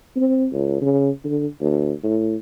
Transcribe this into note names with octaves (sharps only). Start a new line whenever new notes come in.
C4
C#2
C#3
D3
D2
A2